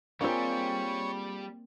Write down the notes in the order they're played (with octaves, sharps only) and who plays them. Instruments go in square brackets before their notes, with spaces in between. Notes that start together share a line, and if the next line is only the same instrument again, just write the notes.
[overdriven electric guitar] G3 [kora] A#3 C4 [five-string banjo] D4 F4 G#4 [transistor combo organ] C#5